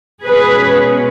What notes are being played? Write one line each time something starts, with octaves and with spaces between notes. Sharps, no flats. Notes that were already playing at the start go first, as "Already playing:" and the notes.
B2 G#3 C#4 G#4 B4